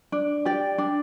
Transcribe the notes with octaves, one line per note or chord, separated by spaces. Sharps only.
D4
G4 D5 G5
D4